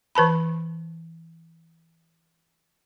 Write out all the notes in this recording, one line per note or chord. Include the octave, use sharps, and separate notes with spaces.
E3 B4 A5 B5